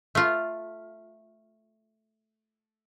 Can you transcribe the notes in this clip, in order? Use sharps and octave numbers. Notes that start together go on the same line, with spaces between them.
A3 F4